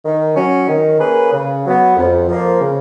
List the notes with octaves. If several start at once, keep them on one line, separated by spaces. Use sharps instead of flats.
D#3
F#3 C#4
D#3
A#3 C#4 G#4 B4
C#3
F#3 B3
F2
F3 A#3
C#3